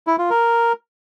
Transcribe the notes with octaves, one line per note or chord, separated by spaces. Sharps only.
E4
F4
A#4